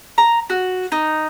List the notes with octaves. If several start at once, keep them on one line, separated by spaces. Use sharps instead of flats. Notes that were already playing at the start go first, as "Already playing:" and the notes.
A#5
F#4
D#4